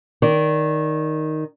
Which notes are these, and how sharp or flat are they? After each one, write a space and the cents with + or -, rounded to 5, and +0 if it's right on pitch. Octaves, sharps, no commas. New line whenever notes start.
D#3 +0 D5 -20